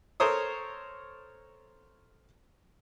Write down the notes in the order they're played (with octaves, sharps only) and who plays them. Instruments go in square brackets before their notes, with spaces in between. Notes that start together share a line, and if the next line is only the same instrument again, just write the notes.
[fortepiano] A4 A#4 C5 C#5 D#6